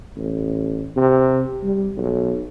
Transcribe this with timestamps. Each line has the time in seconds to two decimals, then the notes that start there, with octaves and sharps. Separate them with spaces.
0.17 A1
0.97 C3
1.64 G3
1.98 B1